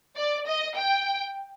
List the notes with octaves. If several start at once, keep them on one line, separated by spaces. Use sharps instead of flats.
D5
D#5
G5